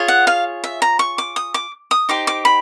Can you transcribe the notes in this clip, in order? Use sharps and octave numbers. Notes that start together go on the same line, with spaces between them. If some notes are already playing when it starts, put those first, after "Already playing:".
Already playing: F4 G#4 C#5
F#5
F5
E5
A#5
C#6
D6
D#6
D6
D#6
D#4 G4 C5 D6
D6
B5